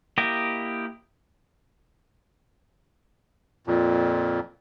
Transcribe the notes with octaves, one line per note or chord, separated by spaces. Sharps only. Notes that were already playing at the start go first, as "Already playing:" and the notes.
A#3 E4 G4 D#5
F2 A#2